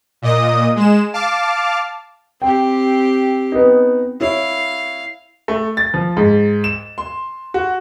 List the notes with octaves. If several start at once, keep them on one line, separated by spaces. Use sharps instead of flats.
A#2 D#5 D#6
G#3 E7
F5 A5 D6 F6
C4 G4 G5
B3 D#4
E4 C#5 F5
A3
A6
F3
G#2
E7
C6
F#4